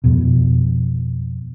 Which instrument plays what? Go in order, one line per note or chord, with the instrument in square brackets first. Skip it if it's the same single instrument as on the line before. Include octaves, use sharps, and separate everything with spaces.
[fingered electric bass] F2 B2